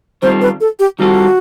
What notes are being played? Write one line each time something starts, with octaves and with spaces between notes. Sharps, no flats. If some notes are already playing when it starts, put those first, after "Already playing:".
D#3 G3 C4 F4 A4 C5
B4
A4
G4
D#3 G3 C4 F4 F#4 A4